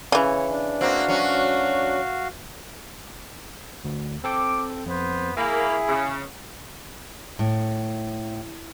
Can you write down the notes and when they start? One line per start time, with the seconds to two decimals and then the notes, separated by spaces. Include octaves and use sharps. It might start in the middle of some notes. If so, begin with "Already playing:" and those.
0.12 C#3 E3 C#5
0.50 D4
0.81 A#3 C4 F#4 F5
1.08 F#3 C#4
3.85 D2
4.24 C4 A4 G5 D6
4.86 F2 B3 C5
5.37 A#3 E4 G#4 E5 G#5 B5
5.88 C#3
7.39 A2